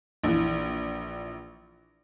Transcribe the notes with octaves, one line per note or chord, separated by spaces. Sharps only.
A#1 E3